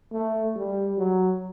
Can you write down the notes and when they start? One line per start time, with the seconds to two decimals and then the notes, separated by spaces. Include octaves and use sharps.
0.13 A3
0.56 G3
0.98 F#3